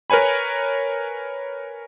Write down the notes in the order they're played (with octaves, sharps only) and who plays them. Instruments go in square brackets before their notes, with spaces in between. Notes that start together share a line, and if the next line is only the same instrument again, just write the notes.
[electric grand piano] A#4 B4 C#5 G#5 B5